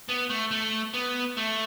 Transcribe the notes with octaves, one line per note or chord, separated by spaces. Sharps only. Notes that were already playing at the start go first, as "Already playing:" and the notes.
B3
A3
A3
B3
A3